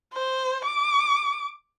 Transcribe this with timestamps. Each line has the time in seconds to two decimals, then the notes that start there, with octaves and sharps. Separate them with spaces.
0.13 C5
0.65 D6